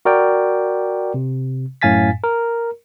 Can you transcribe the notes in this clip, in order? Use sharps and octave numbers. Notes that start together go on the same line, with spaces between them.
F#4 A#4 D5 G5
C3
F#2 A2 F5 G#5 A6 B6
A#4